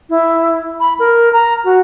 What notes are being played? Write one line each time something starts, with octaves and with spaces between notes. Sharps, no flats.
E4
B5
A#4
A#5
F#4